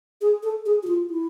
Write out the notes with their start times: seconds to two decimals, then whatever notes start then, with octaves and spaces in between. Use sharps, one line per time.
0.21 G#4
0.43 A4
0.66 G#4
0.83 F#4
0.87 F4
1.10 E4